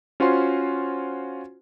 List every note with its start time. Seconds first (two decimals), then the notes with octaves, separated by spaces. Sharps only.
0.20 C#4 F4 F#4 C5 G#5 C6